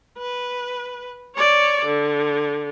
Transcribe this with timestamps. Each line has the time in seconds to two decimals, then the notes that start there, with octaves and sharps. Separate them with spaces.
0.18 B4
1.35 C#5 D5
1.85 D3